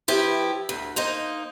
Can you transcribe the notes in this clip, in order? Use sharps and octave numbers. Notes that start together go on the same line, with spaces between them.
F3 E4 G4 B4
D2
A#3 D#4 C5 D#5